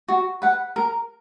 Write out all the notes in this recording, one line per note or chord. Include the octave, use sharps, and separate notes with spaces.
F#4
B4 F#5
A#4